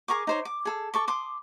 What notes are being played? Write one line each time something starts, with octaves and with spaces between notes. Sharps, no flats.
G#4 A#4 C#6 D6
D#4 C5 C#5
D6
G#4 A4
A4 C#6 D6
C6 D6 D#6